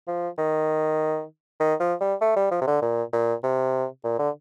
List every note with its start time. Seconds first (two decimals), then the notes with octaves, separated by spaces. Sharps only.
0.07 F3
0.38 D#3
1.60 D#3
1.80 F3
2.00 G3
2.21 A3
2.36 G3
2.51 F3
2.61 C3
2.67 D3
2.82 A#2
3.13 A#2
3.43 C3
4.04 A#2
4.19 D3